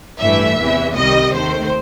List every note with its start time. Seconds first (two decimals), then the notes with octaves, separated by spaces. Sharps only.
0.19 A1 G2 E3 A3 E5
0.58 E2 C3 E3
0.95 C2 C3 D#3 G3 D#5
1.33 D#2 D#3 A3 C5